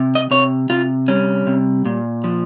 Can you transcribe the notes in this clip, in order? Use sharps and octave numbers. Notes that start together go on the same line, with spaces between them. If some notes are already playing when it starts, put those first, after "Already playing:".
Already playing: C3
D#5
C3 C#5
C3 F4
G3 C#4
C3
A#2
F3